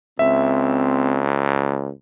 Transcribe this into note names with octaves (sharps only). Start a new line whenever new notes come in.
C#2 C4 E5